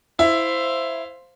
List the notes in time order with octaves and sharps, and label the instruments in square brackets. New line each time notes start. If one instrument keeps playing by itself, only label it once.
[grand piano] E4 [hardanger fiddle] C5 F5